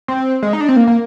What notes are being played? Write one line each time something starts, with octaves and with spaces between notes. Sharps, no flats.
C4
G#3
D#4
D4
C4
A#3
A#3